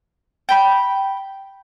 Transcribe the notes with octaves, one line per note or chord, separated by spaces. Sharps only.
G5 B5